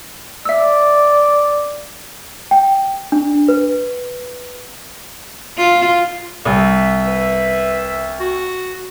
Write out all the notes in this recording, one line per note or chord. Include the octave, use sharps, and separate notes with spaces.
D5 E5 E6
G5
D4
B4
F4
C2 E5
B4
F#4